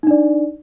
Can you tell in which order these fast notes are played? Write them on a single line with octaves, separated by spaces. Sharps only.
D#4 D4 D5